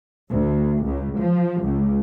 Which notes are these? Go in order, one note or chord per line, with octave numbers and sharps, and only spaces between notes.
D2
C#2
F3
C#2